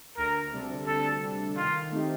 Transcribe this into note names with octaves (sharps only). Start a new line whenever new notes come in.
D2 A#4
C3 G3 D4 A4
D2 A4
C3 G3 D4 A4
D#3 F4
A3 C4 D#4 G4